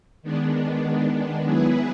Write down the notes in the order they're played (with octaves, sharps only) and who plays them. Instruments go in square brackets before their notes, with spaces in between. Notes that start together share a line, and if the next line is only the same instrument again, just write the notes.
[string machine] D#3 G#3 B3 D4
F#3 B3 E4 G#4 B4